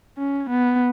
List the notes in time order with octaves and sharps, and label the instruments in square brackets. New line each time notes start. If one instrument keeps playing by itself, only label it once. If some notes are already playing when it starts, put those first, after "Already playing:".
[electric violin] C#4
B3